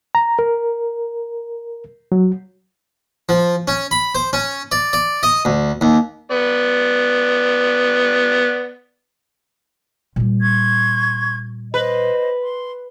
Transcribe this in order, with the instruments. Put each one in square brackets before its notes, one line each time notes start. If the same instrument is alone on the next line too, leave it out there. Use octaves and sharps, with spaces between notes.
[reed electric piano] A#5
A#4
F#3
[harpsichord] F3
C#4
B5
C5
C#4
D5
D5
D#5
D2
D#2
[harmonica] B3 D5
[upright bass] A#2 G3
[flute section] C6 C#6 G#6
[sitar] B4 [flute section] C5 D#5
[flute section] C6